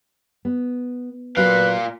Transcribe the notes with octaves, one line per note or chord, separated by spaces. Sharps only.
B3
A#2 F#3 F#4 B4 F5